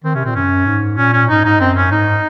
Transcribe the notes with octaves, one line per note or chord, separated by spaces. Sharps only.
D#3 C4
C3 C#4
A#2 C4
F#2 C#4
G#2
A#2 C#4
C#4
G#2 D#4
G#2 D#4
F#2 C4
C#4
G#2 D#4